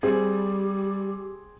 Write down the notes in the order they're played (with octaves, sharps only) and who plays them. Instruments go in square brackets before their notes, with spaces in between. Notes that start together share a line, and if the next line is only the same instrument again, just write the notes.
[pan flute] G3 [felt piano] C4 G#4 [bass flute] G4